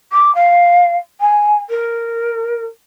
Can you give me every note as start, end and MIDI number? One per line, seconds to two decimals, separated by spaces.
0.12 0.33 86
0.34 0.95 77
1.20 1.56 80
1.69 2.65 70